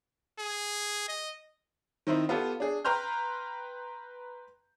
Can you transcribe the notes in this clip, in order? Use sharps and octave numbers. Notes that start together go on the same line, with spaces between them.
G#4
D#5
D#3 C4 D#4 E4 C5
B3 F4 G4 A4
D4 G#4
B4 G5 A#5 C6 F6 G6